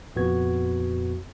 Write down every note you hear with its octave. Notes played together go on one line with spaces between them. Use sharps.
F2 A#2 B3 F#4 G#6